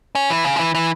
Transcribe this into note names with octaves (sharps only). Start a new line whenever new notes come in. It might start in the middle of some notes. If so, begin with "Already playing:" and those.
C#4
E3
C#3
F3
E3
E3